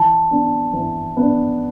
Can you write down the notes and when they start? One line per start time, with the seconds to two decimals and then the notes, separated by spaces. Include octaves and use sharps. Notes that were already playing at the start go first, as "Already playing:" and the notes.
Already playing: E3 A5
0.31 B3 D4
0.73 E3
1.17 B3 D4